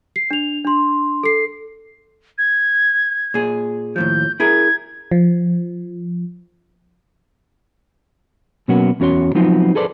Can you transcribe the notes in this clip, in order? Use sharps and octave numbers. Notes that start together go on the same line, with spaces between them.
C7
D4 F7
D4 C6
A4 C7
G#6
A#2 G#4
D#2 A2 F3 G6
E4 G#4 A#4 G#6
F3
B2 F#3 A#3 B3 C#4 F#4
E2 C#4 F#4 C#5 C6
F3 F#3 B3 C4 D#4 F4
G#4 A4 B4 C5 D5